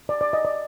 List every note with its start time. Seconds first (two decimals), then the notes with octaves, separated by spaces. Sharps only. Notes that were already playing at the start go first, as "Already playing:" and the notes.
0.09 D5
0.21 D5
0.33 D#5
0.45 D5